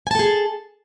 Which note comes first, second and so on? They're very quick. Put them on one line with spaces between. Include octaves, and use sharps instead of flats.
G#5 A5 A4 G#4